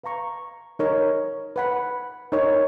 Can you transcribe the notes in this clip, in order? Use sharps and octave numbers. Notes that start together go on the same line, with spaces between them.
B4 F5 A#5 C#6
D#4 A#4 C#5
B4 F#5 B5
D#4 A#4 C#5